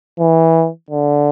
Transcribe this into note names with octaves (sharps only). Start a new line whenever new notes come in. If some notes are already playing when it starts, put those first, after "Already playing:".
E3
D3